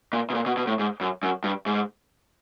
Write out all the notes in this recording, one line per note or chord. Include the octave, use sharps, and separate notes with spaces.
A#2
B2
A#2
B2
B2
A2
G#2
F#2
F#2
G2
G#2